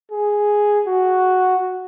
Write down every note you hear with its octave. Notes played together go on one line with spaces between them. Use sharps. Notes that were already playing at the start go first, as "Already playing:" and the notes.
G#4
F#4